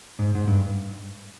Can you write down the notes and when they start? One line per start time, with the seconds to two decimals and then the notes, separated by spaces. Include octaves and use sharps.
0.19 G#2
0.35 G#2
0.47 G2